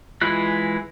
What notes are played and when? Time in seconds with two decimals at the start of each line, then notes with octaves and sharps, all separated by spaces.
0.21 E3 G#3 E4 F4 F#6